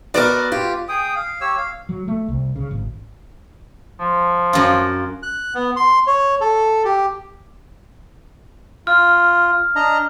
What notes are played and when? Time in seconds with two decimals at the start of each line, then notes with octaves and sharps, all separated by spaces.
0.14 B3 F#4 A4 A#4 D5
0.52 F4 G4
0.88 G#4 G5 D#6
1.15 F5
1.41 G4 C#5 E6
1.57 F5
1.89 F#3
2.08 A3
2.28 C2
2.56 C#3
2.71 G#1
4.00 F3
4.53 F#2 F4
5.23 F#6
5.54 B3
5.76 C6
6.07 C#5
6.41 A4
6.85 G4
8.87 F4 F6
9.76 D4 D#5 A#5